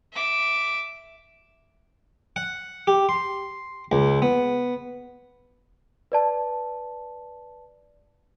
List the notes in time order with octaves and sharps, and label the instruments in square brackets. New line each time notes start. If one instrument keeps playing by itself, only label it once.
[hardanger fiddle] E5 D6
[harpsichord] F#5
G4
C6
C#2
B3
[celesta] B4 D5 A5